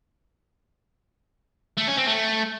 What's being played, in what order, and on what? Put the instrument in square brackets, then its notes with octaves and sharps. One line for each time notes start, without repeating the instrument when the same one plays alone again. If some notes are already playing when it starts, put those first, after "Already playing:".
[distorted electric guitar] A3
C#4
C4
A3